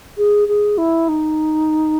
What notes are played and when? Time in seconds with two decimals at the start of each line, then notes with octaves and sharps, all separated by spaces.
0.18 G#4
0.48 G#4
0.78 E4
1.09 D#4